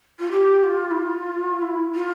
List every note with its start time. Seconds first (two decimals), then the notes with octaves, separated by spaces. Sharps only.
0.19 F4
0.31 G4
0.63 F4
0.91 E4
0.96 F4
1.61 E4
1.94 F4